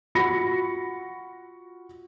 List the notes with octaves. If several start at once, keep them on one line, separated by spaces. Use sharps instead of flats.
F4 F#4 B5 A#6 C#7